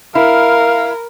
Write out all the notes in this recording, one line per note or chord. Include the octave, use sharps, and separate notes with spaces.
E4 A#4 F5